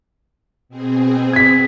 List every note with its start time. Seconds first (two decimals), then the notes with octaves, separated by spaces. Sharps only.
0.69 B2 C4 G#4
1.33 G#6 B6